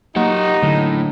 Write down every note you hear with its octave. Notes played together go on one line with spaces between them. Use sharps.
F#3 A#3 D#4 G4 F#5
A2 D3 F#3